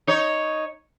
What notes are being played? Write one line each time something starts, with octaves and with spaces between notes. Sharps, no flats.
D#4 C#5